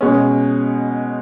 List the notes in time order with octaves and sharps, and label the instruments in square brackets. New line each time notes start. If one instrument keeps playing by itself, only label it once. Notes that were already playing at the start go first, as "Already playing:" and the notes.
[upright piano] B2 G#3 C#4